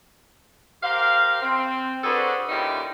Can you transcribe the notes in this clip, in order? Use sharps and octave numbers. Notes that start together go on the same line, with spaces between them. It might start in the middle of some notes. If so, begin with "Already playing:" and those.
G4 A#4 C5 F5
C4
D4 F#4 G#4 A4 B4 C5
A#2 D3 C#4 D#4 E4 G4